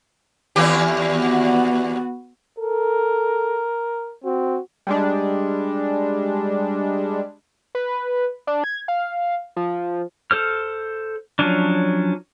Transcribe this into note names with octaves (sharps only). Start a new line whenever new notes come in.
D#2 E3 G4
B3 F#4
A4 A#4
C4 F#4
G3 G#3 D4
B4
D4
G#6
F5
F3
A4 C5 F6
F3 F#3 C#4 D4